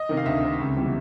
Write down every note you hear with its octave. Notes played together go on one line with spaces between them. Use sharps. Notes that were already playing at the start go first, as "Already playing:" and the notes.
Already playing: D#5
C3 D#3
F5
D2 E5
C3 D#3
C#2
C3 E3 G3 B3